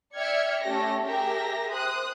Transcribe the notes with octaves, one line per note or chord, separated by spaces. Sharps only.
D5 E5 G5 F6 G#6 C#7
A3 C#4 G4 A#6
G4 G#4 A#4 E5 G5 A#6
C5 D#6 F#6